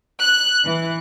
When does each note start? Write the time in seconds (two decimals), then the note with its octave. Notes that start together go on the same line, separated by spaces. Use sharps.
0.21 F#6
0.65 E3